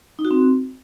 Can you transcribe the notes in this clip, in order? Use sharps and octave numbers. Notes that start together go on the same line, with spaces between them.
D#4
F#4
C4